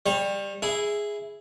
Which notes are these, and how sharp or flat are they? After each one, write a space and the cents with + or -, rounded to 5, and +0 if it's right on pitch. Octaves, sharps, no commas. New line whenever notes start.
G3 +20 C#5 -35
E4 +0 G#4 +0